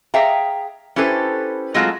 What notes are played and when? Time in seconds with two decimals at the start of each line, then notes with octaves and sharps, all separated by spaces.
0.14 G#4 E5 F5 G5 A#5
0.96 C#4 E4 G4 A4 B4 C5
1.74 F#3 G#3 A3 C4 F4 F#4